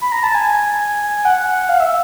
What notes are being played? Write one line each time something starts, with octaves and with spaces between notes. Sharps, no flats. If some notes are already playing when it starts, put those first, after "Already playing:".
B5
A#5
A5
G#5
F#5
F5
E5